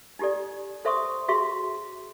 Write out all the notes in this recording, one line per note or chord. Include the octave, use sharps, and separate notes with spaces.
D#4 E4 G4 A4 D5
A4 C5 E5 C6 C#6 D#6
F#4 G#4 E5 C6 C#6